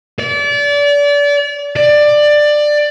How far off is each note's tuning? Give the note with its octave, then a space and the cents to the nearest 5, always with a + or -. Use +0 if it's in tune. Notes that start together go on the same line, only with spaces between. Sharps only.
D5 -30
D5 +15